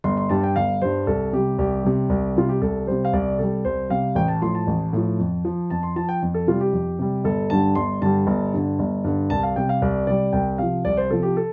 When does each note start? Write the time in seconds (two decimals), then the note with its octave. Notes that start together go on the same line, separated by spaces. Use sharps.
0.04 G1 C6
0.17 C6
0.29 G2 G3 A5
0.43 G5
0.56 G1 F5
0.82 G2 G3 C5
1.07 C2 A4
1.33 C3 G3 G4
1.58 C2 G4
1.84 C3 G3
2.09 C2
2.36 C3 G3 F4
2.49 G4
2.62 C2 A4
2.87 C3 G3 C5
3.05 F5
3.13 C2 D5
3.39 C3 G3 A4
3.65 C2 C5
3.90 C3 G3 F5
4.15 A1 G5
4.28 A5
4.42 A2 F3 C6
4.55 A5
4.67 A1
4.93 A2 F3
5.19 F2
5.45 F3
5.70 F2 A5
5.83 C6
5.96 F3 A5
6.09 G5
6.22 F2
6.34 A4
6.47 C3 G3 F4
6.61 G4
6.73 F2
6.99 C3 G3
7.24 G1 A4
7.50 G2 D3 G3 A5
7.75 G1 C6
8.01 G2 D3 G3 A5
8.27 G1
8.53 G2 D3
8.79 G1
9.04 G2 D3
9.30 C2 A5
9.43 F5
9.56 C3 G3 G5
9.69 F5
9.82 C2 D5
10.07 C3 G3 D5
10.33 C2 G5
10.58 C3 F3 F5
10.85 C2 D5
10.97 C5
11.10 C3 F3 A4
11.23 G4
11.37 A4